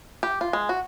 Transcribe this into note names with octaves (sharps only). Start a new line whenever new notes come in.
G4
F4
G#3
F#4